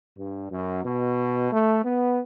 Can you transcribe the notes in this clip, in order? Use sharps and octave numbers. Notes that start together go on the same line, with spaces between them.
G2
F#2
B2
A3
B3